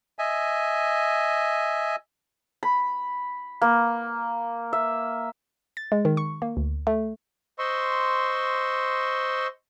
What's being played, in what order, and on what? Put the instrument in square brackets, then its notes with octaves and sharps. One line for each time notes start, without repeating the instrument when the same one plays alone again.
[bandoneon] D#5 E5 G#5
[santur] B5
A#3
E5
[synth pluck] A6
G#3
D#3
C#6
A#3
D2
A3
[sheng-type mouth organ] C5 D#5 C6 C#6 E6